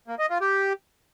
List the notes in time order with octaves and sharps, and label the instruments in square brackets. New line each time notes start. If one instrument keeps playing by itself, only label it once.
[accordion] A#3
D#5
F4
G4